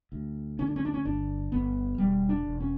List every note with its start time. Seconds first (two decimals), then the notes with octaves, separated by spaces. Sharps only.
0.12 D2
0.59 D3 C#4
0.67 D4
0.76 C#4
0.85 D4
0.94 C#4
1.05 G1 D4
1.52 G1 B3
1.98 E1 G3
2.29 D4
2.44 E1
2.60 C#4